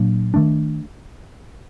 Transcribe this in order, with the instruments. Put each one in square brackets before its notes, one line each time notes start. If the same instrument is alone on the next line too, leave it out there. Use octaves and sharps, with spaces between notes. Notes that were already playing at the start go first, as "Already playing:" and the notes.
Already playing: [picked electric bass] A#2 F#3 A#3 D4
D#3 A3 D4